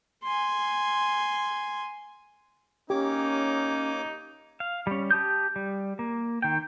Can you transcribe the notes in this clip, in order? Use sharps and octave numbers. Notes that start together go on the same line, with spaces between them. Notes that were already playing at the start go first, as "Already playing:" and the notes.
G#5 C6
A#3 C#4 D#4 G4 C#5 D6
F5
G3 C#4
G4 A5 D#6 G6
G3
A#3
D#3 G5